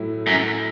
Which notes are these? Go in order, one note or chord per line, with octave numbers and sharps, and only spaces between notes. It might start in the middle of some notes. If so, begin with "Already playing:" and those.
Already playing: A2 F#3 E4
F#2